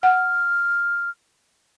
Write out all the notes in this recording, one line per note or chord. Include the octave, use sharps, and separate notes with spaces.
F#5 F6